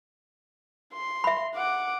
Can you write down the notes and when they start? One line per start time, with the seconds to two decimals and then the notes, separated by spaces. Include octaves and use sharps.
0.94 C6
1.24 E5 B5
1.55 F#5 D6